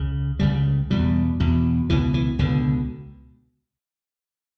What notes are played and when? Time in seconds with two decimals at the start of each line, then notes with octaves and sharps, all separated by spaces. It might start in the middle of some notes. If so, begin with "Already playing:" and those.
Already playing: C#2 C#3
0.39 C#2 C#3 G3
0.90 E2 B2 G3
1.40 E2 B2
1.90 C#2 B2 E3
2.14 E3
2.39 C#2 B2 D3